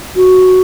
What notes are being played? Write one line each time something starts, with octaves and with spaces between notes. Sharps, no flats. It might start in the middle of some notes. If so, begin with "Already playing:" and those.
F#4